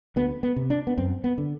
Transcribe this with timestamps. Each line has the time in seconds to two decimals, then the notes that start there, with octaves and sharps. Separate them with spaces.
0.16 D2 B3
0.43 B3
0.56 C3
0.70 D4
0.87 B3
0.98 F#2 C4
1.24 B3
1.38 D3